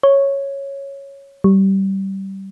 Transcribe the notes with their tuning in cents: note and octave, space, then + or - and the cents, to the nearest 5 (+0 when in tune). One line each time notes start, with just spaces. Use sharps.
C#5 -5
G3 -20